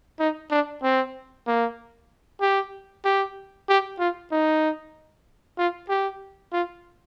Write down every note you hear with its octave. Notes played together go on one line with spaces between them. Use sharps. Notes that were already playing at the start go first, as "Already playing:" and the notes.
D#4
D4
C4
A#3
G4
G4
G4
F4
D#4
F4
G4
F4